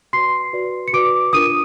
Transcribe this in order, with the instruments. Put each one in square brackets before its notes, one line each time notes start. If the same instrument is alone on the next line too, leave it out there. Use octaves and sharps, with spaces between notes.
[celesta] F#4 B4 D5 C6 C7
F#4 B4 D5
C#7
F#4 B4 D5 D6 D7
D4 F4 A#4 D#6 D#7